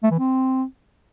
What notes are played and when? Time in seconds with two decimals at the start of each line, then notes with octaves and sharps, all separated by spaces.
0.03 A3
0.11 E3
0.19 C4